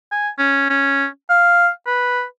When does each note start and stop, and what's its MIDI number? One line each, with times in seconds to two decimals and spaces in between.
0.11 0.29 80
0.38 0.65 61
0.70 1.07 61
1.30 1.69 77
1.87 2.24 71